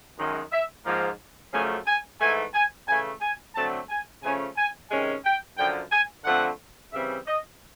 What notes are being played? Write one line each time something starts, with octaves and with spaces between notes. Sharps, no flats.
F#2 D#3 G#3
E5
G#2 F3 A#3
F#2 C#3 F3 A3 G#5
G#5
G#2 E3 A3 G#5
G#5
C#3 E3 A3 G#5
G#5
D3 F#3 A3 C4 A5
G#5
C#3 F3 A3 C#4 G#5
G#5
C3 D#3 G#3 C#4 G#5
G5
F#2 D3 F3 G5
G#5
D3 F3 A3 C4 F#5
C#3 E3 G3 C4 E5
D#5